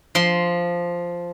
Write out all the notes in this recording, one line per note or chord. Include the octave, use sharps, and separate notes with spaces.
F3 C6